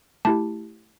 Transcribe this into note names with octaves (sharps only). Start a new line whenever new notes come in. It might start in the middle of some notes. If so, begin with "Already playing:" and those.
A3 E4 G4 A5